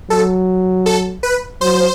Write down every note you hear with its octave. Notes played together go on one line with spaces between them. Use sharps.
F#3 A4
A4
B4
F#3 C5